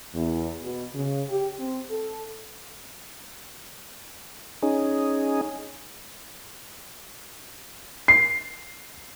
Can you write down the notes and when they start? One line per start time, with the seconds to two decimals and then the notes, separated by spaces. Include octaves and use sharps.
0.14 E2
0.63 B2
0.94 C#3
1.28 G4
1.58 C4
1.90 A4
4.62 C#4 D#4 G#4
8.08 C7